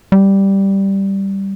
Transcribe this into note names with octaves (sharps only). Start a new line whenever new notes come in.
G3